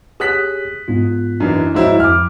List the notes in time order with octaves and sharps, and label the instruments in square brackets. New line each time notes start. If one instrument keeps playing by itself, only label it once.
[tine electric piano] G4 G#4 C#5 [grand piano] D#6 F#6 B6
[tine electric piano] G#2 B3 F4
[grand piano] F#2 E3 [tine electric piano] D4 D#4
[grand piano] G#2 F#3 E4 [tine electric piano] F3 C5 D#5
[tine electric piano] F2 F3 B5 [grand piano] D6 F6